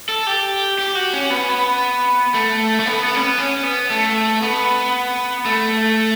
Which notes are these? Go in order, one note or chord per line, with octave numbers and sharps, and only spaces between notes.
A4
G4
G4
F#4
C#4
B3
A3
A3
B3
B3
C#4
B3
C#4
B3
A3
B3
A3